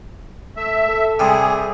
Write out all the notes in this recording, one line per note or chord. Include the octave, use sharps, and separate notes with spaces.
A3 E5
A4
C3 G3 G#4